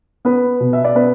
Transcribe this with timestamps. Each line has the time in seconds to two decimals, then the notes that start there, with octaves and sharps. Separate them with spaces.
0.25 B3 B4
0.60 B2
0.73 E5
0.84 D5
0.95 B3 B4